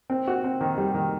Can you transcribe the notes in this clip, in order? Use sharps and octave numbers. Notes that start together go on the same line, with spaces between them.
C4
F#4
C4
D#3
G3
D#3